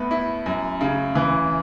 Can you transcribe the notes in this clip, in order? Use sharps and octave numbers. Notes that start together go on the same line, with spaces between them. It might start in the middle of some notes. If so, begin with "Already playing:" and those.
Already playing: A2 B3
E4
F#2
C#3
E3